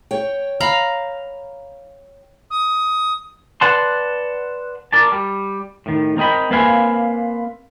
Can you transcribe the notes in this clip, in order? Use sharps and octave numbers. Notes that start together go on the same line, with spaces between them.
C#5 G5
F5 A#5 B5
D#6
B4 D5 F#5 A5 C6
A#4 D5 A5
G3
A2 D#3
C4 A#4 D#5 G5 B5
A#3 C4 B4 E5 F5 G#5